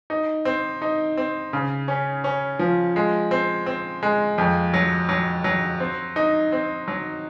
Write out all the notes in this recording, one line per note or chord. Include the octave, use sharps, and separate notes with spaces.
D#4
C4
D#4
C4
C#3
C#4
C#4
F3
G#3
C4
C4
G#3
F2
F#3
F#3
F#3
C4
D#4
C4
F#3